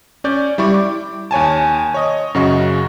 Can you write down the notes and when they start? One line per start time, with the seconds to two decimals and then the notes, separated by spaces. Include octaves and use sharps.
0.24 C#4 C#5 D5 G6
0.58 G3 E4 D5 C#6
0.74 D6
1.31 D#2 C#5 G#5 A5
1.94 C#5 D#5 D#6
2.35 F#2 C#3 F#4 D#5 C#6